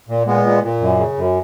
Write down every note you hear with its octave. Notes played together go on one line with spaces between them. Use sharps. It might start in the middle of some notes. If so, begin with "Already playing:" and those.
A#2
A#2 G#3 B3
A#2
A#2
F#2
C#3
F#2